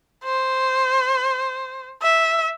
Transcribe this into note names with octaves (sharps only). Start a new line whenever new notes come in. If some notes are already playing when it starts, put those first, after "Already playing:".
C5
E5